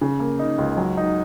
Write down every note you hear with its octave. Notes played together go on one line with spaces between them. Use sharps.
C#3
A#3
D#4
C#2
F#3
D#4